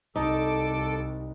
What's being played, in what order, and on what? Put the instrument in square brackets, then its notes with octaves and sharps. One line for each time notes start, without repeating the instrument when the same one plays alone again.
[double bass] C2 [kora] D#4 [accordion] A4 D6